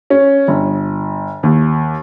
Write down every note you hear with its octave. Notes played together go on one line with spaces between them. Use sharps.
C#4
G1
D#2